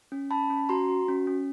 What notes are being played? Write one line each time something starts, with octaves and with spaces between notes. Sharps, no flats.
C#4
C#4 A5 B5
C#4
F#4 A#5 C6
F#4
C#4
C#4